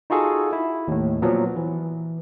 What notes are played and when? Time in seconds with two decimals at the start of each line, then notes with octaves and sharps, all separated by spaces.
0.10 D#4 F4 F#4 G#4 A4
0.53 E4
0.88 D#2 A2
1.22 A#2 F3 F#3 B3
1.56 E3